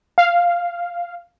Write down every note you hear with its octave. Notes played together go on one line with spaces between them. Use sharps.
F5